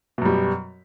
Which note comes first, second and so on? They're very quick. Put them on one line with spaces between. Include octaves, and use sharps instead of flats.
B2 F#2 G3